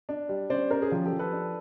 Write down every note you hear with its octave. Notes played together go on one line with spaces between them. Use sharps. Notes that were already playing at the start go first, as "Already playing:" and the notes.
D4
G3
C#4 C5 D5
C#4 A#4 C5
G#4
F3 F4 G4
G4 A4
F3
A4 B4
D4